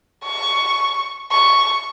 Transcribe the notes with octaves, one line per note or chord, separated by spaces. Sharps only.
C#6
C#6